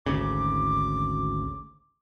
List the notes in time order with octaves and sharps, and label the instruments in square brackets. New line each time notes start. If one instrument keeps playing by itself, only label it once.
[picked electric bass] G#1 D2 C#3 [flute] D6